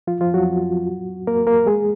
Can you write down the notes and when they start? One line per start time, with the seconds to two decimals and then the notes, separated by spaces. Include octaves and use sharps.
0.07 F3 F4
0.21 F3 F4
0.34 F#3 F#4
1.27 A#3 A#4
1.47 A#3 A#4
1.66 G#3 G#4